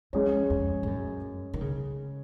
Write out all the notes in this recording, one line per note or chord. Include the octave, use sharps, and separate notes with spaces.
F2 G#3 C#4 G#4 C#5
F2
G#2
F#2
D#3
C#3